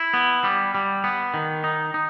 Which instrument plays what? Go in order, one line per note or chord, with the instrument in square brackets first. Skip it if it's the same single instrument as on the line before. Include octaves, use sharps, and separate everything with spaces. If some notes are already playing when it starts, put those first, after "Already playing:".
Already playing: [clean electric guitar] E4
B3
G3
G3
B3
D#3
D#4
D#4